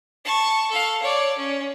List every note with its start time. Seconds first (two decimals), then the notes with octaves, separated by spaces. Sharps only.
0.25 A5 C#6
0.70 A4 F5
1.02 C#5 D5
1.37 C#4